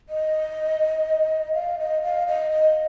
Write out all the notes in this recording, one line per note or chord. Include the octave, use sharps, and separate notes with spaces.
D#5
F5
D#5
F5
D#5
D#5